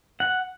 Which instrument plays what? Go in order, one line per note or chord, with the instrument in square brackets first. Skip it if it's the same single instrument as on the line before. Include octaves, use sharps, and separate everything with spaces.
[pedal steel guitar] F#5